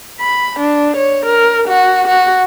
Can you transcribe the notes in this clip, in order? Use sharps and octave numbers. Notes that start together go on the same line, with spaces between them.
B5
D4
C#5
A#4
F#4
F#4